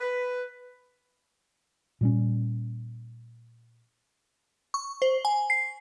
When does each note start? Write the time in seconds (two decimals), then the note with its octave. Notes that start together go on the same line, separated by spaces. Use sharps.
0.01 B4
2.01 A#2 G3 C#4
4.74 C#6
5.02 C5
5.25 G#5
5.50 C7